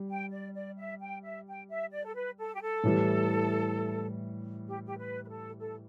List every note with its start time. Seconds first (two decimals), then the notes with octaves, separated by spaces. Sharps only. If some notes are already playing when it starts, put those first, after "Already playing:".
Already playing: G3
0.09 G5
0.32 D5
0.55 D5
0.77 E5
1.01 G5
1.23 E5
1.47 G5
1.70 E5
1.92 D5
2.05 A4
2.15 B4
2.38 A4
2.54 G4
2.61 A4
2.84 A2 E3 G3
4.67 G4
4.87 G4
4.98 B4
5.24 B4
5.28 A4
5.59 A4